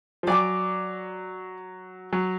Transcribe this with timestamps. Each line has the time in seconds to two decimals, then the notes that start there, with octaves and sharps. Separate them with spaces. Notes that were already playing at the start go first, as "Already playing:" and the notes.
0.23 F3
0.27 F#3 D5 G#5 D6
2.13 F#3